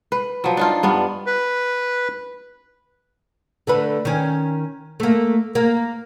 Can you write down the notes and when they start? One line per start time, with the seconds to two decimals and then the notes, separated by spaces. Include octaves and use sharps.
0.12 B4
0.44 F3 F#3
0.57 D4 D#4 F4
0.83 G2 B3 D4
1.26 B4
3.67 D3 A3 B4
4.05 D#3 C#4
5.00 A3 A#3
5.55 A#3